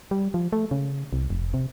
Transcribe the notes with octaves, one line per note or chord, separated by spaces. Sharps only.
G3
F3
A3
C#3
C2
F1
C3